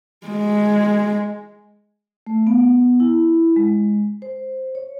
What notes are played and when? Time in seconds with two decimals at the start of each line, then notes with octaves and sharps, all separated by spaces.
0.27 G#3
2.27 A3
2.47 B3
3.00 E4
3.56 G#3
4.22 C5
4.75 C#5